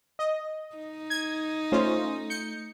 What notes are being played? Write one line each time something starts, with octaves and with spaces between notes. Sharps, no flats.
D#5
D#4
G#6
A3 C#4 F4 C5
G6 C#7